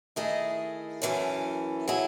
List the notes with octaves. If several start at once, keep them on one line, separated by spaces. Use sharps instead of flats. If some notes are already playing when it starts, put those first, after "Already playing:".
D#3 A3 E4 G#4 D#5
F#2 E3 A3 C#4
F#3 A3 E4 G#4